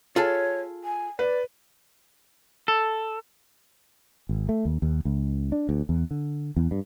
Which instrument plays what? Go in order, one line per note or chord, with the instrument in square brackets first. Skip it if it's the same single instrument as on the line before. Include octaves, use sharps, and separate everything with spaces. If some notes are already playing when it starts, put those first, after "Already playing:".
[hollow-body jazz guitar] F4 G#4 A4 [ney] C#5
[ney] G#5
[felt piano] B4 [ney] D5
[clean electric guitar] A4
[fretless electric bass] G#1
A3
D#2
D#2
C#2
D4
D2
E2
D3
E2
G2